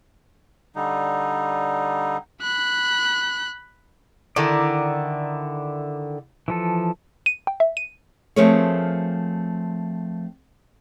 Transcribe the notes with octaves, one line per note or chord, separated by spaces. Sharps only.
D3 G3 D#4
B5 F#6
D3 D#3 E4 D5 A#5
E3 F3 A4
D#7
G5
E5
D#7
F3 A3 C4 G#4 A#4 C#5